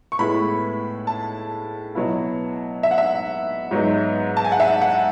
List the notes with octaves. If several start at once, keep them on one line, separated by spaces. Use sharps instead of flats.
C#6
A2 G#3 B3 E4 B5
A5
B2 F#3 B3 E4
E5
F#5
E5
G#2 F#3 B3 D#4
A5
G#5
F#5
E5
F#5